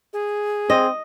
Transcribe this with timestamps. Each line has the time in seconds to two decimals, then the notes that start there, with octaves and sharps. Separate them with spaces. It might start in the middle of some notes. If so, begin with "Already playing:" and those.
0.13 G#4
0.70 C4 D#5